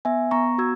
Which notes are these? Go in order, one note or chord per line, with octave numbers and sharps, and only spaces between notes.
B3 E5 G#5
B3 A#5 C#6
F#4 E6 G#6